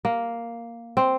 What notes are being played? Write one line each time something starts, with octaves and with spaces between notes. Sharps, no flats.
A#3
C4